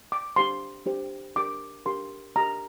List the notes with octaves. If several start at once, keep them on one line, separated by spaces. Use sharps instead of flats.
D6
D4 G4 C5 C6
D4 G4 C5
D4 G4 A#4 D6
D4 G4 A#4 C6
D4 G4 A#4 A#5